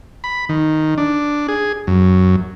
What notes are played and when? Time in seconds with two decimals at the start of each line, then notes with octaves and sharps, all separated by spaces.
0.24 B5
0.49 D#3
0.98 D4
1.48 G#4
1.87 F#2